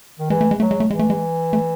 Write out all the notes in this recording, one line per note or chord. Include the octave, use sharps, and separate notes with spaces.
D#3
E3 G#3
A3
G#3
F#3 A3
G#3
A3
E3 G#3
A3
G#3
A3